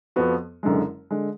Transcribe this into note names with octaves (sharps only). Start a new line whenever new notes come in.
F2 F3 B3 F#4
F#1 F#2 D3 G#3
D3 G#3